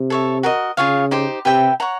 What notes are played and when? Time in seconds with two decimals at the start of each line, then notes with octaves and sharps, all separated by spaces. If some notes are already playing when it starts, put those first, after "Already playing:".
Already playing: C3
0.10 A4 C#5 E5
0.43 F#4 A#4 D#5
0.77 C#3 F4 G#4 C#5 F5
1.11 D#4 G4 C5
1.45 C3 G4 B4 E5 G5
1.80 C#5 F#5 A#5